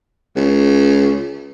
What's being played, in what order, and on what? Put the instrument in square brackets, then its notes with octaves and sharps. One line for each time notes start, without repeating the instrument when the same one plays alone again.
[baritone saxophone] C#2